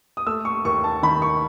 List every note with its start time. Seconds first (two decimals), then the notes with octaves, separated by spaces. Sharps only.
0.17 D#6
0.27 A3 E6
0.45 C#6
0.65 D#2 C#6
0.84 A5
1.03 D#3 B5
1.22 C#6